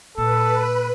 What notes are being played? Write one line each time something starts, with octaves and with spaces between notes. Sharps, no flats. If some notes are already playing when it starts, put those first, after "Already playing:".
A#2 A4 B4